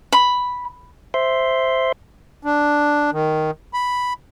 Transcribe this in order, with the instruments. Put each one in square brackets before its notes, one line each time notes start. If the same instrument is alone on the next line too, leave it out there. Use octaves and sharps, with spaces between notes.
[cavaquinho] B5
[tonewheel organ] C5 E5 C6
[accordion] D4
D#3
B5